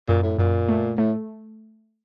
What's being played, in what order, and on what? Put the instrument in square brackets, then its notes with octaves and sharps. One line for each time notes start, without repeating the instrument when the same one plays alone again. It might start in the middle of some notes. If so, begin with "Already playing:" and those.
[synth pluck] F#2 [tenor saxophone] A#2
[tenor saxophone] A2
[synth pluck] F#2 [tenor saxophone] A#2
[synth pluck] A3
[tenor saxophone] A2 [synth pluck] A3